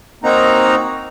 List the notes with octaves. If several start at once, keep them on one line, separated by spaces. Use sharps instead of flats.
A#3 C4 D#4 F#4 A#5